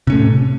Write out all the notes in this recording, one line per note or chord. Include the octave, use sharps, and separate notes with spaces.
A2 C3 A3 C#4